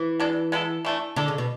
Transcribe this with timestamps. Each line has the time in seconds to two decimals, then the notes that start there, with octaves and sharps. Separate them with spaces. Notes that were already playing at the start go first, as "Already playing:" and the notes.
Already playing: E3
0.20 B2 G#3 D4 A4
0.52 G#3 B3 E4 A4
0.85 E3 A3 D4
1.16 D3 E3 G#3 D4 A4
1.28 C#3
1.38 B2